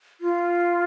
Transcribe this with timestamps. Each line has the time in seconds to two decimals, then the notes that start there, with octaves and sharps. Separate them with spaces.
0.21 F4